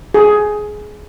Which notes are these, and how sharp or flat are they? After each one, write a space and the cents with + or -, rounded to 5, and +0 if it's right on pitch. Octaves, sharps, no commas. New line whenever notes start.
G#4 +15